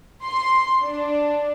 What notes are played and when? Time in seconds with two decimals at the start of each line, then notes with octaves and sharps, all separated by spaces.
0.24 C6
0.84 D4